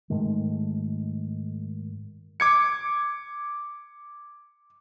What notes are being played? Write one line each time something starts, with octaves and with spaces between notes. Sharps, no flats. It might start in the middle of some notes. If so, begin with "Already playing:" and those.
G#2 D#3 G#3 A3
D6 G#6 C#7